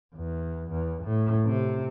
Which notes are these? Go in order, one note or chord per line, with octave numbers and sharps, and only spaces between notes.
E2
E2
A2
C3